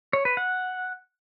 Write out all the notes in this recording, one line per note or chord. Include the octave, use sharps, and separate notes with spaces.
C#5
B4
F#5